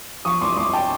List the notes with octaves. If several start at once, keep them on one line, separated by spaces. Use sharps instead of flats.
F3 C#6 D#6
C2 C6 D6
C2 C6 D6
G5 A5